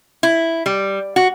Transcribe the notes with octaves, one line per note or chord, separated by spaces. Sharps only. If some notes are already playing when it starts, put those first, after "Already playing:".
E4
G3
F#4